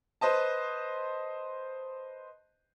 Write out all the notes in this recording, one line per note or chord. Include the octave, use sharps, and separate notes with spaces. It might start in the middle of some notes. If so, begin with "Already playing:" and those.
B4 C5 D#5 A5